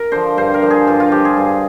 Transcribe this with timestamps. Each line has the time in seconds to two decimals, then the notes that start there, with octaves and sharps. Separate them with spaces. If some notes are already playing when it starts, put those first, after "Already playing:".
Already playing: A#4
0.12 D3 F3 C5
0.37 G2 C5
0.54 A#4
0.62 D3 F3
0.70 G#4
0.87 G2 F4
1.00 F4
1.12 F3 G4
1.25 G#4
1.37 G2